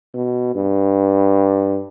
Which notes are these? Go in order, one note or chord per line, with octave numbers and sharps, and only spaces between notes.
B2
G2